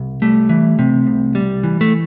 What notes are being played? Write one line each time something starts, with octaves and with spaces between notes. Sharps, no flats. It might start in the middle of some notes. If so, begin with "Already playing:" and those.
Already playing: C2
G3 A3
E3
C3
C2
G3
E3
A3